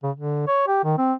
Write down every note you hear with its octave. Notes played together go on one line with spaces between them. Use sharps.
C#3
D3
C#5
G4
D#3
C4